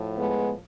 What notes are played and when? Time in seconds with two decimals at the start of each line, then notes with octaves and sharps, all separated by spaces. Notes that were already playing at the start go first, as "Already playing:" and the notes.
Already playing: A2 F3
0.18 G#3 B3